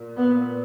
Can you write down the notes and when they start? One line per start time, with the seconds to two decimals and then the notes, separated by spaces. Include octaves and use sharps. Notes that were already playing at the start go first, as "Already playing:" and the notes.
Already playing: A#2
0.16 B3